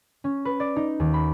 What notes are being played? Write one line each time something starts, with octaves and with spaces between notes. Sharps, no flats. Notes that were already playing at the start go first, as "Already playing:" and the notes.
C#4
B4
D5
D#4
D#2
B5